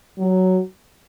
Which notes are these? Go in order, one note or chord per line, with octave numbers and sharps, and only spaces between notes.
F#3